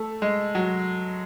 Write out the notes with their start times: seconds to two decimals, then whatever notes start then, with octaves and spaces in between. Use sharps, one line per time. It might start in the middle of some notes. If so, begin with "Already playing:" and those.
Already playing: A3
0.22 G#3
0.55 F#3